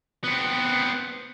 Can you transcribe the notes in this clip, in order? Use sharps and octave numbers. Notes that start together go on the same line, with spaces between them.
B3 C4